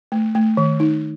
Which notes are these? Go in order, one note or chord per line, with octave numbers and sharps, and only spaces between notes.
A3
A3
D#3
D#4